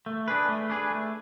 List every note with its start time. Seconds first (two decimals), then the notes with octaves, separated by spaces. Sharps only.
0.06 A3
0.28 D4 G#4 B4
0.49 A3
0.70 D4 G#4 B4
0.91 A3